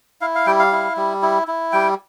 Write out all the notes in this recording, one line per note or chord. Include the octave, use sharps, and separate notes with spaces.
E4 F5
F5
G3 G5
F5
E4
G3
E4
E4
G3 G5